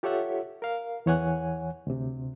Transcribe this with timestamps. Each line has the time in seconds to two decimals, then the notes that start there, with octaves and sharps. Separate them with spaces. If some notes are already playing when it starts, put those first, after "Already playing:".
0.03 F4 G4 A4 C#5 E5 F#5
0.62 A#4 F5
1.06 E2 E3 C#5 F#5 G#5 F#6
1.87 D2 C3